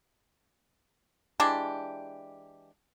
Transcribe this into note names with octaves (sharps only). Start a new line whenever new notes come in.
E3 G#3 D4 G4